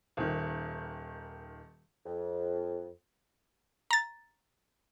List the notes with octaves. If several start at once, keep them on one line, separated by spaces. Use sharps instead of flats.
D#1 D#3
F2
A#5 A6